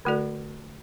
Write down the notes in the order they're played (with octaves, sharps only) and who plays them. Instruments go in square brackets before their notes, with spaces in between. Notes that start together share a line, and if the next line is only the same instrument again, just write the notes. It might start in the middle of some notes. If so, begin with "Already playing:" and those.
[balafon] D3 A3 F#4 A4 D5